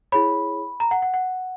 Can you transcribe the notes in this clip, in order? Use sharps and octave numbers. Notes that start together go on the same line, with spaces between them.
E4 G#4 C#5 B5
A#5
F#5
F#5
F#5